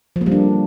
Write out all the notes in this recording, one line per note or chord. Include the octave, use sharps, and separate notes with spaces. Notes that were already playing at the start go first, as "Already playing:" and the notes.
F3
A#3
G3
D4